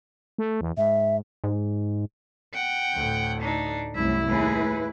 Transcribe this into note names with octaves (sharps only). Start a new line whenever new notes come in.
A3
E2
G#2 E5
G#2
F#5 G5
D2 A2
D4 D#4
C2 F#2 A2 E4 E5
D#2 A2 G#4 B4